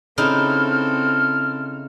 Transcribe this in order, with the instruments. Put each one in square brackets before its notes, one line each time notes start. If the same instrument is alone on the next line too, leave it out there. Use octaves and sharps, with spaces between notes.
[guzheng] C#3 D#4 E4 [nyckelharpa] C4 A4 [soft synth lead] F6